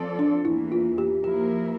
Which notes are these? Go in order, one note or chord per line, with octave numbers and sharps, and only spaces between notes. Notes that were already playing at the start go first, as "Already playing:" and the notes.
Already playing: F3 C4 F4 A4 D5
D4
E2 E3 A#3 E4
F4
G4
F3 A#3 E4 G4 A#4